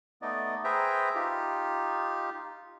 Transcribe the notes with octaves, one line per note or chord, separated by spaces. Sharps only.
A3 B3 D#4 D5 D#5
G#4 B4 C5 E5 G5 A#5
D#4 F4 G4